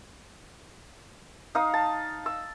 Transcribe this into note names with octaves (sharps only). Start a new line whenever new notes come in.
D#4 F5 D#6
A5
E6